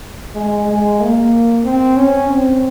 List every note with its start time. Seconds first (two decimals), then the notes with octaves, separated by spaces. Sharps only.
0.35 G#3
0.68 G#3
1.00 A#3
1.65 C4
1.97 C#4
2.30 C4